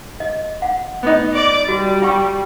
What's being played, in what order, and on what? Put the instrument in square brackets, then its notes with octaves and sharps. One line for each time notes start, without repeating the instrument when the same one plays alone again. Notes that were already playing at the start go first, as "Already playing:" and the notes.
[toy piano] D#5
F#5
[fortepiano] B3 D#4
[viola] D5 D6
[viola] G3 [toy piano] F#4
[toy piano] F4 G5 C#6